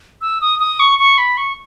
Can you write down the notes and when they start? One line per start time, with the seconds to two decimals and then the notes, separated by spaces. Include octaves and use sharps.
0.21 E6
0.41 D#6
0.60 D#6
0.80 C#6
0.99 C#6
1.18 B5
1.37 C#6